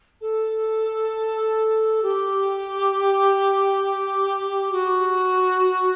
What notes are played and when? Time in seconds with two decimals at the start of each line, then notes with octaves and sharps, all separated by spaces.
0.21 A4
2.02 G4
4.72 F#4